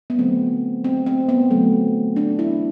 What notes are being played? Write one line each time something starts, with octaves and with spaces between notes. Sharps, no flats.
B3
D3 F#3 A3 C4
C4
C4
B3
D3 F#3 A3
D4
E4